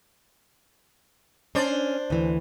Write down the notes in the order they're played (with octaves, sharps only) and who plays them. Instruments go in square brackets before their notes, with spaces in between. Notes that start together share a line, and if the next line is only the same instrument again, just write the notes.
[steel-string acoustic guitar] C#4 [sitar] D4 C5 D5
[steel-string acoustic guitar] D2 E3